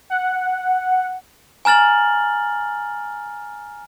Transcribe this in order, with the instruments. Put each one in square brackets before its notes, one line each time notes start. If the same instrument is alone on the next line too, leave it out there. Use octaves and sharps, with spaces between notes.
[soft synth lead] F#5
[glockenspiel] G#5 A#5 F6 A6 F#7